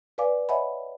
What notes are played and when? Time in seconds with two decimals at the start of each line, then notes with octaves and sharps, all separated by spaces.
0.18 B4 D5 F5 G#5 D6
0.49 C#5 D#5 E5 F#5 G#5 B5